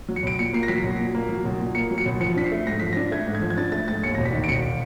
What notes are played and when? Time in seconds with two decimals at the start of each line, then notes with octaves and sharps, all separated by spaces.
0.09 F#3
0.16 C#7
0.23 B1 D7
0.39 A#2 C#7
0.53 A#3 C7
0.63 A#6
0.68 F#3 B6
0.84 B1
0.99 A#2
1.15 A#3
1.29 F#3
1.45 B1
1.60 A#2
1.75 A#3 C#7
1.91 F#3
1.98 C#7
2.06 B1
2.20 F3 C#7
2.37 D4 B6
2.44 C7
2.52 A3
2.67 G#2 A#6
2.80 F3 B6
2.93 D4 A#6
3.11 A3 G#6
3.27 G#2
3.35 G#6
3.42 F3
3.50 G#6
3.57 D4 A6
3.72 A3 A6
3.88 G#2 A6
4.03 D#2 C#7
4.15 E1 A#6
4.25 B6
4.33 D#3
4.44 D7
4.49 E1 C#7